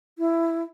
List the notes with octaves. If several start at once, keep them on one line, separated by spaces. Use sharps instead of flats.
E4